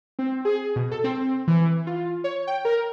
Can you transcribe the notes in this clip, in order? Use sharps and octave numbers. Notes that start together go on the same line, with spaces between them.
C4
G#4
B2
A4
C4
E3
F4
C#5
G5
A#4